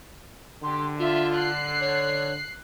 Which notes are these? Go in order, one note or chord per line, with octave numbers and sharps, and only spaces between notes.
D3 G4 C6
F4 E5
F#6 C7
C#5